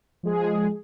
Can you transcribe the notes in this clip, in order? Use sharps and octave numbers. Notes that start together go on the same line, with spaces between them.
F3 G#3 G#4